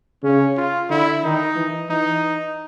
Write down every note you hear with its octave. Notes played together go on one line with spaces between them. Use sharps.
C#3 C#4
F4
D3 E4
D#3 D#4
E3
E3 D#4